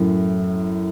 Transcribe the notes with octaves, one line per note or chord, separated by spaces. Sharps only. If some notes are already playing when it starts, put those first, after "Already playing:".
Already playing: F#2 A2